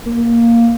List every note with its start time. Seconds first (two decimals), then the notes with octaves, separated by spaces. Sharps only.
0.06 A#3